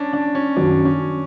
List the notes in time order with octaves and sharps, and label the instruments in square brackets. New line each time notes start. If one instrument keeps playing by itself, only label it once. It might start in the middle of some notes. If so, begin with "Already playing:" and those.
Already playing: [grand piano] C#4 D4
D4
C#4
[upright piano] F#2 D#3 F#3 [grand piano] D4
[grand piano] C#4